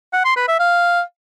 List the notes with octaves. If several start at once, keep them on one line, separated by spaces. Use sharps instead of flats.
F#5
C6
B4
E5
F5